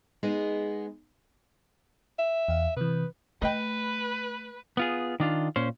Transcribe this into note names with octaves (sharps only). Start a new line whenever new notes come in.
G#3 B3 D#4 G#4 D#5
E5
E2 F5
C3 E3 B4
A3 B4 D#5 G5
B3 F4 G#4
D#3 D4 F4
A#2 C#4 C5